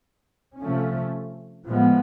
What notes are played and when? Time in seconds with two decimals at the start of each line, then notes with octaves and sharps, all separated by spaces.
0.60 C3 F3 A3 C#4
1.66 A2 F3 G#3 B3